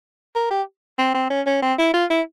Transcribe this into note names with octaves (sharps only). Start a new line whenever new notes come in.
A#4
G4
C4
C4
C#4
C#4
C4
E4
F4
E4